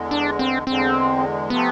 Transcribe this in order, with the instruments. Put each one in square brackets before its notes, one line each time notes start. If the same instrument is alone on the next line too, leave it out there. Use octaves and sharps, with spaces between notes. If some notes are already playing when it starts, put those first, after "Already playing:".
Already playing: [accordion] E2 D3 G#3
[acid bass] D4
C4
[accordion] E2 D3 G#3 [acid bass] C4
[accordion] C3 F3 A3 C4 [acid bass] B3